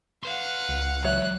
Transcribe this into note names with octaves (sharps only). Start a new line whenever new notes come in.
B4 F5 F#5 C6
C#2
F#3 G#3 C#5 E5 F#6